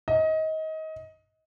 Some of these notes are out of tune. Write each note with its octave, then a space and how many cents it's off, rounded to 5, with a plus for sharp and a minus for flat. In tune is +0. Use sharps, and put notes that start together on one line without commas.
D#5 +25